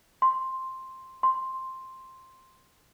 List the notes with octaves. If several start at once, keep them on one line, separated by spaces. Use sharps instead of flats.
C6
C6